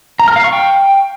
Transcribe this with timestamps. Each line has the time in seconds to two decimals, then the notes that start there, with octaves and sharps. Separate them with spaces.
0.20 A#5
0.28 F6
0.36 F5
0.44 C#6
0.53 G5